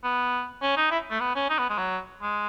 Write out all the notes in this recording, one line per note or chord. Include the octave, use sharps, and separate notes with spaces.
B3
C#4
D#4
E4
A3
B3
C#4
D#4
B3
G#3
F#3
G#3